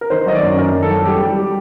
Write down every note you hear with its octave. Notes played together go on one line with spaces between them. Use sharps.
A#4
D#3 C5
F#3 D#5
D5
F#2
D#3 A#4
F#2
A4
F#3
G3 G4
G3
G3